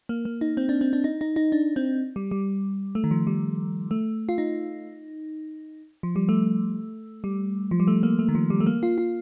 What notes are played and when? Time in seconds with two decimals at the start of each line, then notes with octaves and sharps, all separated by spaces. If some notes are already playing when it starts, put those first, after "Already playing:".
0.09 A#3
0.25 A#3
0.41 D#4
0.57 C4
0.69 D4
0.81 C4
0.93 D4
1.04 D#4
1.21 D#4
1.36 D#4
1.52 D4
1.76 C4
2.16 G3
2.31 G3
2.95 A3
3.04 D#3
3.11 F3
3.27 G3
3.91 A3
4.29 F4
4.38 D#4
6.03 F3
6.16 G3
6.29 A3
7.24 G3
7.71 F3
7.80 G3
7.88 A3
8.03 A#3
8.19 A3
8.28 D#3
8.35 F3
8.50 G3
8.60 A3
8.66 A#3
8.83 F4
8.98 F4